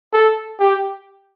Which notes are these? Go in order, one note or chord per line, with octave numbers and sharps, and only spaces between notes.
A4
G4